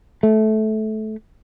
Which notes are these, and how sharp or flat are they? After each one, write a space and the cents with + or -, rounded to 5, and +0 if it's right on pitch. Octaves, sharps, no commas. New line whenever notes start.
A3 -20